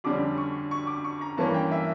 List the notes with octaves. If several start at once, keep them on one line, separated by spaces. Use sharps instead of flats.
F2 D3 G3 C#4 D6
C#6
C#6
D6
C#6
A#5
G2 E3 A#3 C#4 A5
G5
E5